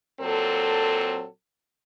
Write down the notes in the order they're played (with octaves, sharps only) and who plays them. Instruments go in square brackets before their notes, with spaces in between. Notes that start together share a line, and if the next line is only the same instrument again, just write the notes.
[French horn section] A#2 F#3 C4 A4